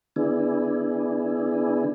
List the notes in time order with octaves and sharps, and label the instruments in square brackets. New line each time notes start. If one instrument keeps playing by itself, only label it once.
[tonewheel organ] D3 B3 D4 E4 G#4